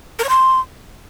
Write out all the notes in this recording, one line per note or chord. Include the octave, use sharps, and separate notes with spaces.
A#4
C#5
C6